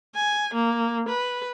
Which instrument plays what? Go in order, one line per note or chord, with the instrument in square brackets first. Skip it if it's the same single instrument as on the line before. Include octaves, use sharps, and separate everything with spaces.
[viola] G#5
A#3
B4